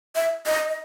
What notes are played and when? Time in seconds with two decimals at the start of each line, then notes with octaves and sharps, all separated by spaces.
0.15 E5
0.46 D#5
0.68 D#5